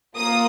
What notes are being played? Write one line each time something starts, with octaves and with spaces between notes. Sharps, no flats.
A#3 F4 D#6